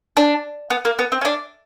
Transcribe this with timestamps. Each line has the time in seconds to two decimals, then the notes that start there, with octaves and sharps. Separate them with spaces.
0.17 D4
0.70 B3
0.85 A#3
0.99 B3
1.12 C4
1.21 C#4
1.25 D4